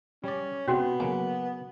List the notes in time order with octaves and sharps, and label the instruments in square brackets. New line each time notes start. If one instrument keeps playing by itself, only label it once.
[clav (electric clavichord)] G3 D5 [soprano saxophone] C#4
[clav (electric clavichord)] C3 [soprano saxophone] B3 [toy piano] C#4 F#4
[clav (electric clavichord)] C#3 F#3 A#3 [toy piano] G#5